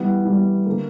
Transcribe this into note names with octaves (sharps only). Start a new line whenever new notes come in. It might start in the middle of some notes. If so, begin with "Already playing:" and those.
Already playing: E3 G3 B3
E3 G3 B3
D3 A#3